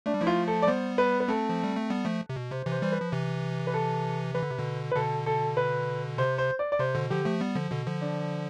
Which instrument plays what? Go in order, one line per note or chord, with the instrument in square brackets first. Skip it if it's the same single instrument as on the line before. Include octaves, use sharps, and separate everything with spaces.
[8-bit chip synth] A3 [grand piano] D4
[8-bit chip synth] G3
[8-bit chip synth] F3 A3 [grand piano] E4
[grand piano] F4
A4
D5
[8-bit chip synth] G3 B3 [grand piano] C5
[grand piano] B4
B4
[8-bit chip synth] A3 C4 [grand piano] A4
[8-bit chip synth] F3
G3
A3
G3 B3
F3 A3
C3
B2
[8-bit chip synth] C3 [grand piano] C5
[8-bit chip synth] C3 E3
[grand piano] C5
[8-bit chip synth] E3 G3 [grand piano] C5
[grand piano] B4
[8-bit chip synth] F3
C3 E3
[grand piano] B4
A4
[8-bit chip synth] E3 [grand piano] B4
[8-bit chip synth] D3
C3
B2 D3
[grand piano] B4
[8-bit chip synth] B2 D3 [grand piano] A4
[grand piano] A4
B4
[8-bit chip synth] C3 [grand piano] C5
[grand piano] C5
D5
D5
[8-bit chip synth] C3 [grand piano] C5
[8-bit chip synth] B2 D3
[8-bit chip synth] D3 F3 [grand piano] G4
[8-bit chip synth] F3 A3
G3 B3
D3 F3
B2 D3
D3 F3
[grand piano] D4